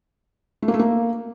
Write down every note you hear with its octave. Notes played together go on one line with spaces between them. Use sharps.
A3
A#3
A3
A#3